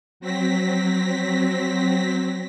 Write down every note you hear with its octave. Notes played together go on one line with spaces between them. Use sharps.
F#3 C4 A#6 B6